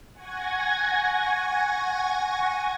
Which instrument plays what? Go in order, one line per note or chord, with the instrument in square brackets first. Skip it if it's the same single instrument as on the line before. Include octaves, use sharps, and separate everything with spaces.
[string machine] F#5 G#5 C#6 G#6 A#6